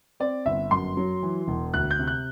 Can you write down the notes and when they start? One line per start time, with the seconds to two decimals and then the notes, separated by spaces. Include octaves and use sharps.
0.20 C4 D5
0.46 G1 E5
0.71 F#2 C6
0.97 F#3
1.23 E3
1.48 E1
1.74 D2 F#6
1.91 G6
1.99 C3
2.07 F#6